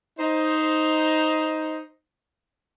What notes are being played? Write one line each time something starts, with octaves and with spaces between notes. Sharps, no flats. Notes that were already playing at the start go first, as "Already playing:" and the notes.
D#4 C5